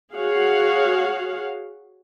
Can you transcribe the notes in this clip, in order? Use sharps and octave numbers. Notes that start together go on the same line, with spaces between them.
F#4 G#4 C#5 F5 F#5